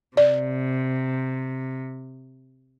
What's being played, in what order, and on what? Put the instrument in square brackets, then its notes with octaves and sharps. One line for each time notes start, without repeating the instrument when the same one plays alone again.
[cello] C3 [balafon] D5